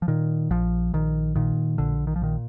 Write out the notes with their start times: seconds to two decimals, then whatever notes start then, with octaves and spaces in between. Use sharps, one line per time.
0.02 F3
0.08 A#2 D#3
0.50 A#1 F3
0.93 A#1 D#3
1.36 A#2 D#3
1.78 A#1 D3
2.07 D#3
2.16 F3
2.22 A#2 D#3